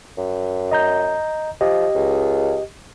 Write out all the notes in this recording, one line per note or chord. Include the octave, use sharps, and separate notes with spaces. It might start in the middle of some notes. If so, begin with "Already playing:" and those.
F#2
D#5 A#5 G6
F3 G4 D#5
C#2